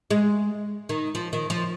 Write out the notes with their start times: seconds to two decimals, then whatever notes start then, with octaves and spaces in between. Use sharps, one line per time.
0.11 G#3
0.89 D#3
1.15 F3
1.33 D#3
1.50 F3